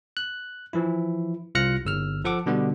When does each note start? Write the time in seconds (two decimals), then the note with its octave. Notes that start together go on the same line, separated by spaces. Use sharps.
0.17 F#6
0.73 E3 F3 E4
1.55 C2 F4 F6 F#6 A#6 C#7
1.85 G1 E6 F6
2.25 F3 A4 F#5 D6
2.46 B2 D3 G3 B3